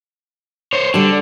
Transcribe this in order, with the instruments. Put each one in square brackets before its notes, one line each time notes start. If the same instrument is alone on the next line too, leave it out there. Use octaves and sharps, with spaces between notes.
[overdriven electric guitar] C5 C#5
[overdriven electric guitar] D3 [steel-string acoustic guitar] G3 A5